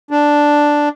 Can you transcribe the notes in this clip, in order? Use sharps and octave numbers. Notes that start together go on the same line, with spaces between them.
D4